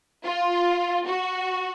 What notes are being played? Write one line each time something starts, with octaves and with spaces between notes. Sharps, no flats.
F4
F#4